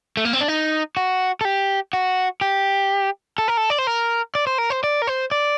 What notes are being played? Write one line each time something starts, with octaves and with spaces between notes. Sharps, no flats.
A3
A#3
C4
D4
D#4
F#4
A4
G4
F#4
G4
A4
A#4
A4
D5
C5
A#4
D5
C5
A#4
C5
D5
A#4
C5
D5